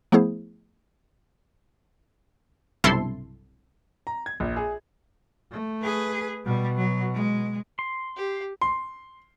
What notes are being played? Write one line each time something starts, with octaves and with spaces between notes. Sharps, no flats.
F3 A3 B3 E4 G#4 C5
B1 G2 C3 E4 A4 C6
A#5
G#6
A#1
G#4
A3
G#4 B4
B2 G3
F#3
G#3
C6
G4
C6